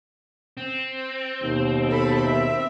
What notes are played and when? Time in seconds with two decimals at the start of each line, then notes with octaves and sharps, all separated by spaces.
0.57 C4
1.42 D#2 B2
1.88 A4 B5
2.26 E5